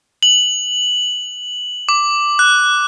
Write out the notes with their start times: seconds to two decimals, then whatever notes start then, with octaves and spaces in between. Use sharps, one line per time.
0.23 F#7
1.89 D6
2.39 F#6